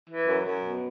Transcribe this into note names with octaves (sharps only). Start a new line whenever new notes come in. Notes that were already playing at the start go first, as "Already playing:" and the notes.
E3
F#2
F#2
B2